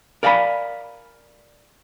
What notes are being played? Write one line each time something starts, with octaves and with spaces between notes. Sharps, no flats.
A#4 D5 F5 G#5 A5 B5